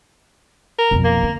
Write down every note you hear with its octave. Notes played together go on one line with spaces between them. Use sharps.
A#4
B1 F2
A#3
D3